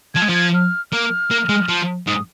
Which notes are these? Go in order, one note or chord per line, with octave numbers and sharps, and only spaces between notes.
F3 G#6
G#3
F3 G#6
F6
A#3 F6
A#3
G#3
F3
G#2 D#6